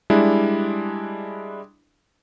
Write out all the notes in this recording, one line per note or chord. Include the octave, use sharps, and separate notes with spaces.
G3 G#3 D4 E4